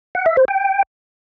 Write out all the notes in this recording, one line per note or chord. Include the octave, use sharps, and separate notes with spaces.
F#5
E5
C5
G5